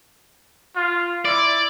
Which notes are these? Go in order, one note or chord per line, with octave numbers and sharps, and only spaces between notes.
F4
E4 D5